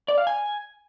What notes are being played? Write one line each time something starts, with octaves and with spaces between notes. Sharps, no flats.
D5
F5
G#5